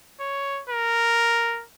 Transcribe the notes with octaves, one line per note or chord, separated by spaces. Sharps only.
C#5
A#4